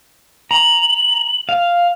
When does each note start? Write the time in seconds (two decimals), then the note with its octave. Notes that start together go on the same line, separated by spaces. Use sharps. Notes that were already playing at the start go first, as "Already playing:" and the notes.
0.51 A#5 F#7
1.49 F5